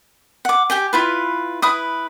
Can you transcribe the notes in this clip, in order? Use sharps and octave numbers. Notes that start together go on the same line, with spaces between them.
F#5 D6
G4 G5 G#5
E4 F4 B4
E4 B4 D#6